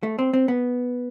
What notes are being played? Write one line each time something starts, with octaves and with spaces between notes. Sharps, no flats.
A3
C4
C4
B3